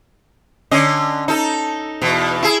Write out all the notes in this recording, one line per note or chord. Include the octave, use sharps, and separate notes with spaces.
D3 C#4 D#5
D#4 A4
E2 B2
E4 G#4